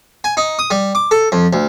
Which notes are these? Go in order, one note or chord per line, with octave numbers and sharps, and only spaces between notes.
G#5
D#4
D#6
G3
D6
A4
F2
D2